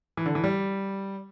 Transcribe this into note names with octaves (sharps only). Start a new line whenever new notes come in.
E3
D3
E3
G3